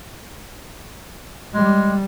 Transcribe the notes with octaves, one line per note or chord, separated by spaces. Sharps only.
G3 G#3